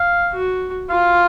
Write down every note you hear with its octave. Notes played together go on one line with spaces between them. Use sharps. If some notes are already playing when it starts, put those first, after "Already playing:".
Already playing: F5
F#4
F4 F5